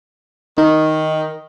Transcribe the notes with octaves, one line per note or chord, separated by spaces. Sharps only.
D#3 D#4